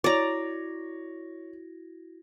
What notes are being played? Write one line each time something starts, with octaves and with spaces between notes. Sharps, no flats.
E4 F#4 C#5 D5 A#5 A#6